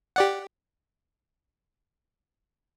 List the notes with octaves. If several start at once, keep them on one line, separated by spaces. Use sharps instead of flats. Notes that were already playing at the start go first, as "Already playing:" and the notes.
G4 D5 F#5